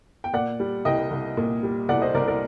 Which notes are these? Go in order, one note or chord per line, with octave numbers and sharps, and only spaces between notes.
G5
A#2 D5 F#5
G3
C2 D#5 G5
C2
A#2
G3
C2 D5 F#5
C5 D#5
C2 A#4 D5
A#4 D5